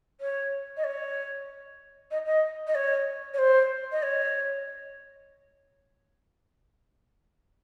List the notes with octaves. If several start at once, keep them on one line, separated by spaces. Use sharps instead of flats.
C#5
D#5
C#5
D#5
D#5
D#5
C#5
C#5
C5
D#5
C#5